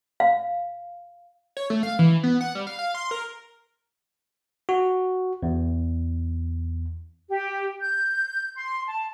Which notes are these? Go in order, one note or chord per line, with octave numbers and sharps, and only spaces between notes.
F5
C#5
A3
F5
E3
B3
F#5
G3
F5
F5
C6
A#4
F#4
E2
G4
G6
C6
A5